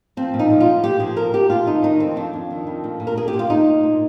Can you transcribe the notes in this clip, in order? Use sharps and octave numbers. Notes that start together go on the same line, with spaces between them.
F3 C4
A#2
D#4
F3
F4
F3
A#2 G4
F3 G#4
A#2 A#4
A#2 G4
F2 F4
D#3 D#4
D#3 D#4
F2 C4
F2 D4
F2
D#3
F2
A#2
A#2
A#4
A#2 G#4
G4
A#2
F4
A#2 D#4
A#2
A#2